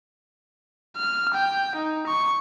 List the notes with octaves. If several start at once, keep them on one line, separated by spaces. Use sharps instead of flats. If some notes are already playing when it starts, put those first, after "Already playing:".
F6
G5
D#4
C#6